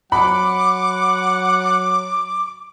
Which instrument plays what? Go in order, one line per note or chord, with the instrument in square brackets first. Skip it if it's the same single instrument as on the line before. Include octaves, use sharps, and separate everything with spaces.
[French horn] F#3 [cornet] F#5 [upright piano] B5 [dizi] D6